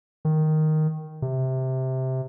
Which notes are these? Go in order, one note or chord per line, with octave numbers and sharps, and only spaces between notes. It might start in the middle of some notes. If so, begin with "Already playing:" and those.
D#3
C3